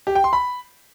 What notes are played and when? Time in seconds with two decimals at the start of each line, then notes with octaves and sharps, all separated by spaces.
0.07 G4
0.15 G5
0.24 C6
0.33 B5